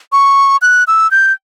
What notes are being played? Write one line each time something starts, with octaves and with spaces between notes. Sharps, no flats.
C#6
F#6
E6
G6